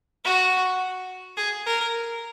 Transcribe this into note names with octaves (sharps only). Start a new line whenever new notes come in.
F#4
G#4
A#4